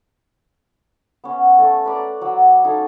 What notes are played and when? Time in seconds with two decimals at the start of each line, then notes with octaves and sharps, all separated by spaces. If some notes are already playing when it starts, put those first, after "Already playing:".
1.24 B3 C#4
1.58 A3 A5
1.86 B4 D5 A#5
2.21 F#3
2.64 C#4 D#4 A4 F5